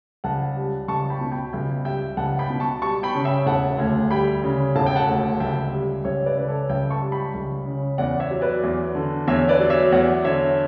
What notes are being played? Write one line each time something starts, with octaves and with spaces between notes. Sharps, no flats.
C#2 F#5 A5
G3
C#2 A5 C#6
G5 B5
B2
G5 B5
C#2 E5 G5
G3 E5 G5
C#2 F#5 A5
G5 B5
B2
A5 C#6
G3 A5 C#6
G5 B5
C#3
E5 G5
E1 F#5 A5
D2
G3 G5 B5
C#3
E1 A5
G5
F#5 A5
D2
C#2 E5 G5
G3
C#2 C#5 E5
B4 D5
C#3 B4
A4 C#5
C#2 E5 G5
A5 C#6
G3
G5 B5
C#2
C#3
E2 D5 F#5
C#5 E5
F#3
B4 D5
E2
D3
E2 C#5 E5
B4 D5
F#3
C#5 E5
E2 D5 F#5
D3 C#5 E5